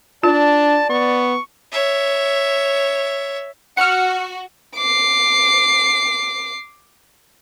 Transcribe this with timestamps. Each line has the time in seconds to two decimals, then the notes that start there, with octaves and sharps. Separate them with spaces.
0.24 D4 F4 D5 A5
0.90 B3 C#6
1.72 C#5 E5
3.77 F#4 F#5 F6 C#7
4.76 D6 C7